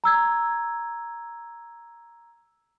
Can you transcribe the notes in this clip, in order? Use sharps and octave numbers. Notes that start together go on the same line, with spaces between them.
A#5 E6 G#6